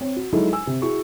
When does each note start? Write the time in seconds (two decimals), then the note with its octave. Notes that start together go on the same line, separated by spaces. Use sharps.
0.01 C4 C#5
0.17 F#4
0.33 F#3 G#3 D#4 E4 A4
0.53 G#5 E6
0.67 C3
0.82 E4 F#4 G#4 C#6